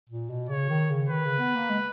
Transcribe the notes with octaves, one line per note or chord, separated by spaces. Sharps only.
A#2
B2
C#3 C#5
D#3
C#3
D#3 B4
C#3
B3
A#3
G#3